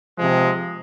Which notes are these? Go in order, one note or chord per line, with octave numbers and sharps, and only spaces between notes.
C3 F3 G#3